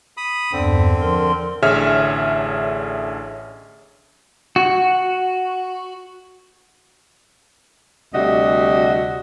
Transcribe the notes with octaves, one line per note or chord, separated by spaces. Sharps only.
B5 D#6
E2 G2 D3 C4
F3 A#4 C6
A1 D3 G#4 C#5 E5 F6
F#4
D2 C3 G3 F#4 D#5 E5